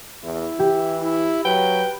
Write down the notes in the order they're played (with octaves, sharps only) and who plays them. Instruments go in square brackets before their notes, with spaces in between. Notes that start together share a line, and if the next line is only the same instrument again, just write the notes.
[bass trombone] E2 [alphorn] E4
[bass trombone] E3 [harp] G4
[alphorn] E4
[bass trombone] F#3 [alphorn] B4 [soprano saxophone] G5